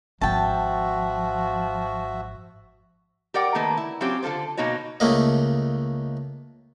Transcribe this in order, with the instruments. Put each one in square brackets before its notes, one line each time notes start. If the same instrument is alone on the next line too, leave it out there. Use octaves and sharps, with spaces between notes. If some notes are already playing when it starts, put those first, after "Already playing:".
[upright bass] G#1 G#2 [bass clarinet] F3 [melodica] F#4 E5 [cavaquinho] G5 A5
[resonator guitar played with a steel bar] G4 A#4 D5 F#5 G5
D#3 A3 A#3 B4
E4
F#3 C4 C#4 F4 G4
D3 D4 F4 A4 C5
B2 A#3 D#4 F#4 C#5
[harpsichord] C#2 A3 A#3 D#5